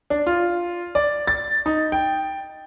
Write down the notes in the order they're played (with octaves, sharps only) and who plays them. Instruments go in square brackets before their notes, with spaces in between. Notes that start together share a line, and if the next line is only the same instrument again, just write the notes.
[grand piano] D4
F4
D5
A6
D#4
G5